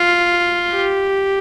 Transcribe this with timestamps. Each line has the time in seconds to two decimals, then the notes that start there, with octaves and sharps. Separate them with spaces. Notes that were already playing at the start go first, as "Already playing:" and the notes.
Already playing: F4
0.72 G4